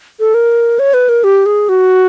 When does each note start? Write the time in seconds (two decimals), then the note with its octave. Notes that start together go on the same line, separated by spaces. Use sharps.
0.20 A4
0.34 A#4
0.79 C#5
0.94 B4
1.09 A#4
1.24 G4
1.46 G#4
1.69 F#4